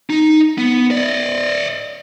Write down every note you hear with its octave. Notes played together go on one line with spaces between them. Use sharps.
D#4
B3
D5 D#5